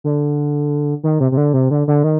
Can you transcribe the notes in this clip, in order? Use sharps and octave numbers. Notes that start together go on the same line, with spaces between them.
D3
D#3
C3
C3
D3
C3
D3
D3
D#3